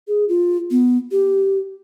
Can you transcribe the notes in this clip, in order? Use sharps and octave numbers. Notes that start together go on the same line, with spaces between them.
G#4
F4
B3
G4